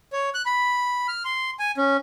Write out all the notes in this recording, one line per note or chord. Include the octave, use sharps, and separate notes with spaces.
C#5
F#6
B5
F6
C6
G#5
C#4